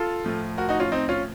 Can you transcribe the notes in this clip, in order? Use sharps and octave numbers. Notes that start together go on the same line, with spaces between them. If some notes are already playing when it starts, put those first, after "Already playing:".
Already playing: F4 A4
A2 F3
F#4 A#4
D#4 F#4
C#4 F4
C4 D#4
C#4 F4